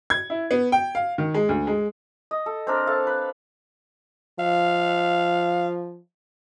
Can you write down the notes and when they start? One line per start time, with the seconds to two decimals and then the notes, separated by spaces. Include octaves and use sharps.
0.10 G#6
0.30 E4
0.51 B3
0.72 G5
0.95 F5
1.18 D#3
1.35 G#3
1.49 D2
1.67 G#3
2.31 D#5
2.46 A4
2.67 C4 D4 A#4
2.87 A4 F5 A5
3.07 B4
4.39 F3 F5